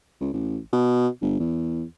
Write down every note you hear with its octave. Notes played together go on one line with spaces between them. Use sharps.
C#2
A1
B2
G1
E2